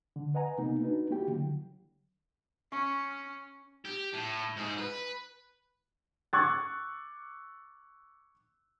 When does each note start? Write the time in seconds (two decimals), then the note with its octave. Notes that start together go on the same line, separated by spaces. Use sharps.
0.16 D3
0.35 B4 D#5 F#5 G#5 A#5
0.58 C3 A#3 B3 D#4
0.81 D4 D#4 F#4 B4
1.11 A#3 E4 F#4 G4 G5
1.28 D3 F#3
2.72 C#4 C#6
3.85 G4
4.14 A2
4.56 G#2 G#4
4.78 B4
6.33 C#6 D6 E6 F#6 G#6 A6